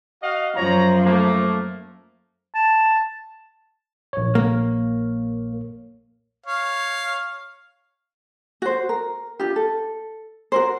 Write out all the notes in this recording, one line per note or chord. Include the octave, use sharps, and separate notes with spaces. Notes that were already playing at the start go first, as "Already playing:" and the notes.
F#4 D#5 F5
F#2 F3 C#5 A#5
A3 A#3
A5
A#1 C#5
A#3
C#5 F5
F#4 C5
A#4
D4 F4 G4
A4
F#4 A#4 C5